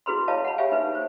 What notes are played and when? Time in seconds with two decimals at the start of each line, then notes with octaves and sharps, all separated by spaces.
0.06 E4 F#4 G#4 B4 B5 C6
0.28 E4 B4 C#5 D#5 F5 A5
0.45 F#5 B5
0.58 G4 C#5 E5 F5 G#5
0.72 D#4 B4
0.95 C5